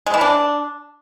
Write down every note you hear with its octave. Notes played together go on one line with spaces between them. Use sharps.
G#3
E3
D4